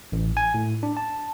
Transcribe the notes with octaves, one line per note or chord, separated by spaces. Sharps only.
A1
G#5
A2
D4
A5